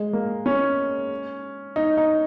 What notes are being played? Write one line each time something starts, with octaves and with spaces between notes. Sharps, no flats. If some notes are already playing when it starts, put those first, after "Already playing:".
Already playing: G#3
A#3
C#4
D#4
D#4